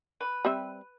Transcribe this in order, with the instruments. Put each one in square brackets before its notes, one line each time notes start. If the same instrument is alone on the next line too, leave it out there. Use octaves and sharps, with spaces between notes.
[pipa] B4
[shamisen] G3 C4 E5